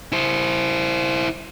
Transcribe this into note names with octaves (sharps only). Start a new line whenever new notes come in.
E4 C5